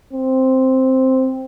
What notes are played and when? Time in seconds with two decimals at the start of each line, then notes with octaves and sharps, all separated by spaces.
0.13 C4